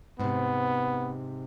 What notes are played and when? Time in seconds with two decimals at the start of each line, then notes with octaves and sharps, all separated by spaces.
0.20 G#2 C3 B3